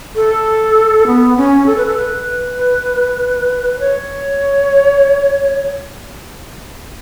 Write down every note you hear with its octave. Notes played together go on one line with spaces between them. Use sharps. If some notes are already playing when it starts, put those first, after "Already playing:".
A4
B3
C#4
A4
B4
A4
B4
C#5